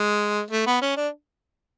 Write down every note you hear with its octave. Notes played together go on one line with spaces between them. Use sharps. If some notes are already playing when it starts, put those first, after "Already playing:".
Already playing: G#3
A3
B3
C#4
D4